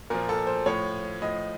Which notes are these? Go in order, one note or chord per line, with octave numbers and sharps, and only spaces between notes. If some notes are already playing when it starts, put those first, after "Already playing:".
A#2 F3 A#4
A4
C5
A2 F3 C#5
A2 F3 D#5